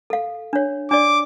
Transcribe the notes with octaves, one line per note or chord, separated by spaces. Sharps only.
A4 F5
D4 C#5
D4 D5 D6